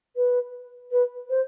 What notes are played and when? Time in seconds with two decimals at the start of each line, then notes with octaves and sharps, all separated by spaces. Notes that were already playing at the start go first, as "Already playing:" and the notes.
0.16 B4
0.92 B4
1.29 C5